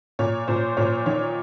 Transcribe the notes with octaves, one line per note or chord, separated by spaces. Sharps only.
A#2 C#5
A#2 C5
A#2 C#5
D#3 C#5